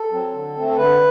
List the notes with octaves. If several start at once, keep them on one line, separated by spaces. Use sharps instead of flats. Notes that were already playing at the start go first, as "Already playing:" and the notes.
Already playing: A4
F#3 C4
D3
A3 C4
A4
D3 B4